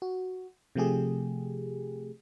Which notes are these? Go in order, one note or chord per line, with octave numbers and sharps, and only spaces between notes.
F#4
C3 F3 A3 G4 G#4